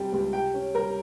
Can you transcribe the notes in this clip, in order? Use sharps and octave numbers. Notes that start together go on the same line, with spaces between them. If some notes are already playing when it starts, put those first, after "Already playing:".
Already playing: C3 G3 C4 G5
C#2
C3 G5
C#4
G3 A#4